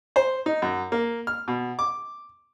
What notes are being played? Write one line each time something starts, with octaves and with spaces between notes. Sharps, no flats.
C5
D#4
F#2
A#3
F6
B2
D6